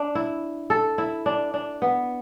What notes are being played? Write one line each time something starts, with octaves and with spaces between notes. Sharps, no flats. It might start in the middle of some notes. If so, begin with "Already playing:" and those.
Already playing: D4
E4
A4
E4
D4
D4
B3